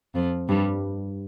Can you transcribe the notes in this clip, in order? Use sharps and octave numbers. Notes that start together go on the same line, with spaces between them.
F2 F3
G2 G3